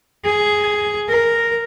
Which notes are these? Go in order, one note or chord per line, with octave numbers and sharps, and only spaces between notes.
G#4
A#4